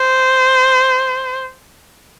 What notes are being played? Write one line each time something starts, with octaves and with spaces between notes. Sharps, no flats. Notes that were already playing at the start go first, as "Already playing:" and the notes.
Already playing: C5